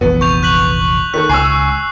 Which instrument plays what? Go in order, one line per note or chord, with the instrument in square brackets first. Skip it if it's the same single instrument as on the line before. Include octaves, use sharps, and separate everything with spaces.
[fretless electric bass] F1 A#1 E3 [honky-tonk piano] B3
[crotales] C#6 G6 F7
F#6 B6 F#7
[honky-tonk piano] D#3 A4 [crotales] F#6 B6
[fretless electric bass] C#2 [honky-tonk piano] G#5 C#6 E6 [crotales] C7